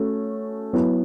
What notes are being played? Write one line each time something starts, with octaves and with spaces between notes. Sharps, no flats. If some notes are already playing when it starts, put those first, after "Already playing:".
Already playing: A3 C#4 F#4
F#3 B3 E4